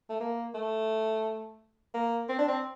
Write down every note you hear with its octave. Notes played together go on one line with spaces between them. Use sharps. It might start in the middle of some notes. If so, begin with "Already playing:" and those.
A3
A#3
A3
A#3
C4
D4
C4